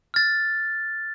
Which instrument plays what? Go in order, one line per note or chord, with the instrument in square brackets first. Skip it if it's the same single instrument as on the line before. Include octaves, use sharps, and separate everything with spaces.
[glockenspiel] F6 A6